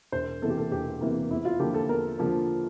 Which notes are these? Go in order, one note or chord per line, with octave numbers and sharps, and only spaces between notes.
E1 C5
E2 C3 E3 A#3 A4
G4
A4
E1 G4
E2 C3 E3 A#3
E2 E4
F4
D3 F3 A#3 G4
A4
E2 A#4
D3 F3 A#3